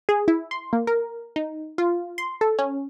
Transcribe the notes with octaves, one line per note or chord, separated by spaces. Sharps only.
G#4
E4
C6
A#3
A#4
D#4
F4
C6
A4
C#4